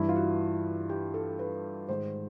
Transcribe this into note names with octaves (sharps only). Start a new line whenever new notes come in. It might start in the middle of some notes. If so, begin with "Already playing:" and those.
Already playing: G2 E3 E4
F4
F#4
G4
A4
B4
G#2 D#3 C5